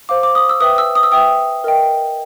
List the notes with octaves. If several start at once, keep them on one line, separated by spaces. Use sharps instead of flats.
C5 F5 D6
D6
D#6
E6
B4 E5 G5 D#6
E6
D#6
E6
B4 E5 G5 D#6
A#4 D#5 G5